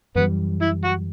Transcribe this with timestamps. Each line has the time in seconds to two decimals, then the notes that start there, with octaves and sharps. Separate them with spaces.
0.15 F#2 E3 G3 B3
0.62 E4
0.84 F#4